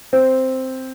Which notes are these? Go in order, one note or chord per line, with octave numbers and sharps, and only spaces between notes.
C4